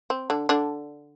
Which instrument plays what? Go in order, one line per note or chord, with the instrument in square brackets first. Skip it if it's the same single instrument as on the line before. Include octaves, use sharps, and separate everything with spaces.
[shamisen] C4
D3 D4
D3 D4